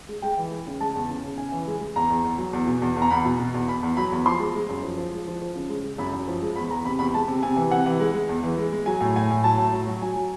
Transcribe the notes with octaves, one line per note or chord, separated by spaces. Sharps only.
G#3
G#3 G5
E3
G#3
C#3
G#3 A5
E2
C#3
C#3
C#3 G#5
E3
G#3
G#3
E2 A#5
E2
E2
F#3
E2
B2
E2
E2
A#5
E2 B5
B2
B2
E2
E2 B5
E2
F#3 B5
E2
F3 C6
G#3
G#3
F#2
F3
F3
G#3
F3
F3
C#3
G#3
G#3
F#2 B5
F#2
F3
G#3
E2 B5
E2 A#5
C3 B5
E2 B5
G#3 A5
C3
C3 G#5
E3
C3 F#5
E3
G#3
G#3
E2
E3
G#3
G#3
F#3 G#5
A2
A2 G#5
A2
F#3 A5
A2
F#3
F#3
F#3 G#5
F#3